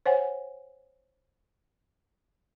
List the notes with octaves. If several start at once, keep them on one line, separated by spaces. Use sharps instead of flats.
C5 C#5 F#5 G#5